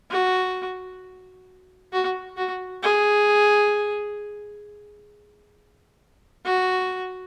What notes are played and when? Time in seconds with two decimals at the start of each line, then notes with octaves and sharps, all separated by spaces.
0.11 F#4
1.93 F#4
2.37 F#4
2.83 G#4
6.45 F#4